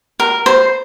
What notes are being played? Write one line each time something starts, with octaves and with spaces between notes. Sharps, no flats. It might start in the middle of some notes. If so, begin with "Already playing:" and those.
A#4
C5